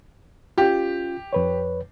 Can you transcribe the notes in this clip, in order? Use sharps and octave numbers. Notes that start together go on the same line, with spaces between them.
C#4 F4 G4
F2 B4 C#5